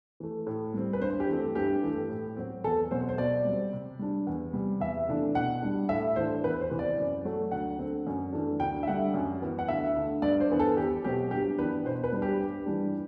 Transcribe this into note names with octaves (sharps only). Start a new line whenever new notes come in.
E3 A3
A2
G3 C4
B4
G2 C5
G4
E3 A3 C4
G2 G4
E3 A3
A2
F#3 C4
E2 A4
B2 F#3 C4 C5
C5
B2 D5
G3 C4
C3
G3 D4
E2
C3 G3
E2 E5
C3 E3 A3 D4
B2 F#5
G3 D4
A2 E5
E3 A3 D4 C5
E2 B4
C5
C3 E3
D5
F#2
F#3 A3
D2 F#5
D3 A3 C4
F#2
E3 A3 D4
D2 G5
E5
D3 G3 F#5
F#2
E3 B3
F#5
D2 E5
D3 A3
G2 D5
C5
E3 B3 D4
A4
E2 G4
B2 F#3 C4 G4
G2 G4
E3 B3 D4 B4
B2 C5
B4
G3 D4
G4
G2
E3 G3 D4